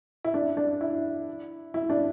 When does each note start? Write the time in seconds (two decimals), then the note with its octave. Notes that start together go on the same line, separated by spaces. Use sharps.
0.24 E4
0.34 D4
0.57 D4
0.81 E4
1.74 E4
1.90 D4